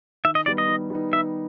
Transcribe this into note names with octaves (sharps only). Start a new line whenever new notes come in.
D#3 E5
D#5
G3 B3 D#4 D5
D#5
D#3
G3 B3 D#4
D#3 E5